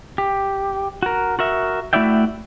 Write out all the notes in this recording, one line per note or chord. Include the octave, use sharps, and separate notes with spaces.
G4
F#4 A#4
F#4 A#4 E5
A3 E4 F#4 D5 E5 G5